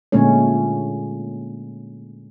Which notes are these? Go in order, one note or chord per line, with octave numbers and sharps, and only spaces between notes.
A#2 D3 G#3 A3 C#4 C#5